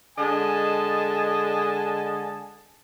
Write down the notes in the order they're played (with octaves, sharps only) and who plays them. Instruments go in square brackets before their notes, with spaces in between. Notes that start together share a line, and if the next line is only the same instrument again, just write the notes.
[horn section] D3 G#3 D#5 G#5 A5